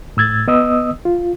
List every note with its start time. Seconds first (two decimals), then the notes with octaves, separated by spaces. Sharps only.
0.17 A2 E6 G#6 A6
0.48 B3 D#5 D#6 E6
1.05 F4